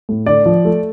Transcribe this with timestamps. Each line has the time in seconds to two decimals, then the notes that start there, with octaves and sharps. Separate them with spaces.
0.09 A2
0.26 D3 D5
0.46 F3
0.65 A3